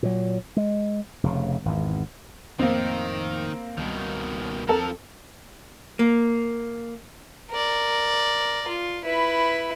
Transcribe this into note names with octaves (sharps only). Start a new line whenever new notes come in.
A#2 F#3
G#3
F1 C#3
G#1 E2
F2 A2 D#3 A#3 C4
C#2 B2 D#3 G3
D#2 F3 A#3 C4 A4 A#4 A5
A#3
A#4 D5
F4
E4 B4